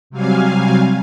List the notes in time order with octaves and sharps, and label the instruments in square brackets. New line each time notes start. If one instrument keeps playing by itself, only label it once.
[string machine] C3 F#3 G3 F5 G#5